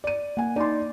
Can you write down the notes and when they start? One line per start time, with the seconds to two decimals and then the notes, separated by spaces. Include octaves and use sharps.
0.04 D5 D#7
0.37 A#3 F#5 G#5
0.56 D#4 D5 C6